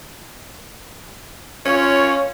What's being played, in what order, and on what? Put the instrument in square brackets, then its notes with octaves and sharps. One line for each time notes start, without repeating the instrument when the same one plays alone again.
[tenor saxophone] C#4 [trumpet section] F4 C#5